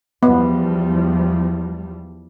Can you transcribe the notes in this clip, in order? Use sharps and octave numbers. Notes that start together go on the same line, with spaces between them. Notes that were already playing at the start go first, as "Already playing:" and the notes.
E2 F3 G3 B3